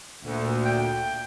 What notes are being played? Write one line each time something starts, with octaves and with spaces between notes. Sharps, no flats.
D2 A#2
G5